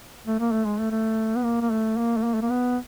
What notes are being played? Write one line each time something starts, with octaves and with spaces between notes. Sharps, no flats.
A3
A#3
A3
G#3
A3
A3
B3
A#3
A#3
A3
A#3
A3
A#3
A3
A#3
B3